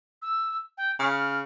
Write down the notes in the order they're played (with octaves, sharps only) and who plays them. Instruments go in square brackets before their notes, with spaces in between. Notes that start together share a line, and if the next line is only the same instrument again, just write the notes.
[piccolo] E6
G5
[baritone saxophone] C#3 [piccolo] F6